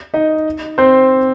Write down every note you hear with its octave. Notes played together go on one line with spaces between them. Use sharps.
D#4 D#5
C4 C5